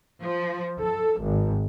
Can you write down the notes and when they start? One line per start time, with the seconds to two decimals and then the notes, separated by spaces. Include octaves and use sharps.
0.23 F3
0.83 A4
1.22 G#1